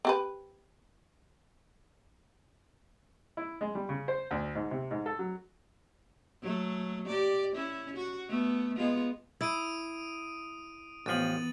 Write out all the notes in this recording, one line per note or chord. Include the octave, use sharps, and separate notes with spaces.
C4 G4 B4
E4
G#3
G3
C#3
C5
D2
G#2
C3
G#2
A4
F#3
F#3 A3
G4 D5
C#4 E4
F#4
A3 B3
G#3 B3 F4
E4 D#6 D7 D#7
A1 E3 F3 B3 A6 D#7 F#7